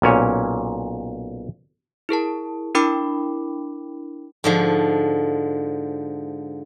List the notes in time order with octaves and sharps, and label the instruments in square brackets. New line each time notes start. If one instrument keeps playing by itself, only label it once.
[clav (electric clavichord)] B1 A#2 C#4 C#5
[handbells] E4 G#4 A#4 A5
D4 E4 A#4 G5 B5 D6
[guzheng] G#2 D3 F3